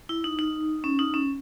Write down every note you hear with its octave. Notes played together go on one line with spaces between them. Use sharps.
E4
D#4
D#4
C#4
D#4
C#4